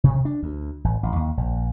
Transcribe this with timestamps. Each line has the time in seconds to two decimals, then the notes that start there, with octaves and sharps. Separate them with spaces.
0.04 C3
0.25 D4
0.43 D2
0.84 A1
1.03 A1
1.16 D#2
1.37 A#1